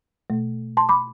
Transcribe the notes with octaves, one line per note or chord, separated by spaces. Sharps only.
B2 A3
A5 C6
B5 D6